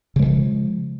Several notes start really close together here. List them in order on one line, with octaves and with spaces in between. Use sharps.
C#3 G#3 E3 F3